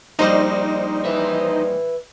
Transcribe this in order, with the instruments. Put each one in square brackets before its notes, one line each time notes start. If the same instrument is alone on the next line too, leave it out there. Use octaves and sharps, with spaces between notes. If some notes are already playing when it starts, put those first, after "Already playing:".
[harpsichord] A#1 G3 [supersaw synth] D#4 C5 D#5
[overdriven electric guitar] B4 E5